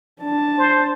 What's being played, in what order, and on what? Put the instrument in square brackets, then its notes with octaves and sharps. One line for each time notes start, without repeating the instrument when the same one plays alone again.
[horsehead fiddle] D4 A5
[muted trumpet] C5